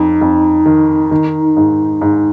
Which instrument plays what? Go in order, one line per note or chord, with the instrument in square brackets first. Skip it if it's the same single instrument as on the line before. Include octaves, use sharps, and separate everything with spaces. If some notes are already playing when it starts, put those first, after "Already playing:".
Already playing: [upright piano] F2 [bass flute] D#4
[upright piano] F2
D#3
D#3
G#2
G#2